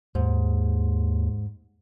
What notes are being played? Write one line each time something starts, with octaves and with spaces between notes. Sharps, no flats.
D#2 G#2